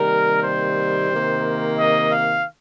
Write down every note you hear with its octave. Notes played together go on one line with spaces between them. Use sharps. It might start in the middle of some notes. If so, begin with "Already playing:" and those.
Already playing: C3 D#3 G3 A#3 A#4
C5
C3 D#3 A#3
D#5
F5